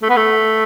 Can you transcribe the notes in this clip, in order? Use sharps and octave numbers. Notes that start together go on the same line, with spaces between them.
A3
B3
A3